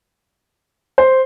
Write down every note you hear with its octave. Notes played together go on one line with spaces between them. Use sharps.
C5